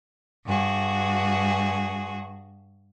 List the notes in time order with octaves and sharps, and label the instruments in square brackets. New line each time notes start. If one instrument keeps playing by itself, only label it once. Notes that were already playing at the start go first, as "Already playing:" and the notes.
[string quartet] G2 F#4 G#4